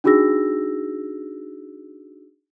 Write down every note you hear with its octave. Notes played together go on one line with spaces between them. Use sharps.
D4 D#4 F#4 G#4 E6 A#6